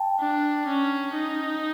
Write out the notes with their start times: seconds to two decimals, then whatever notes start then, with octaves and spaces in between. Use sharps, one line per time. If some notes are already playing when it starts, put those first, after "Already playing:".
Already playing: G5 A5
0.20 D4
0.67 C#4
1.14 D#4